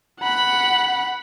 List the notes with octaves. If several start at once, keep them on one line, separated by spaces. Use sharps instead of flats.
F#5 B5